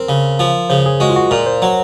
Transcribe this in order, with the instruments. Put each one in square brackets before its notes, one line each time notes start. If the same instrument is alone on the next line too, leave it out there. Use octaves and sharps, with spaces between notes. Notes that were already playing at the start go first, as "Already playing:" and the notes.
Already playing: [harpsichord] C4 [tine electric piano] A#4
[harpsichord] C#3
F3
[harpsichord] C#3 [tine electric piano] C5
[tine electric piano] G#4
[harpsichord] G#3 [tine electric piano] F#4
[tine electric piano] F4
F#4
[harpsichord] A#2 [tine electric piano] A#4
[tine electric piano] C5
[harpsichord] F#3 [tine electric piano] C#5